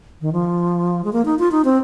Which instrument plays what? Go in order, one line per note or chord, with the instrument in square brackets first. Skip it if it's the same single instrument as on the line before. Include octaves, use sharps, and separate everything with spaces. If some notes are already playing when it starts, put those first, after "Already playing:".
[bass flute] D#3
F3
G#3
A#3
D#4
F4
D#4
C4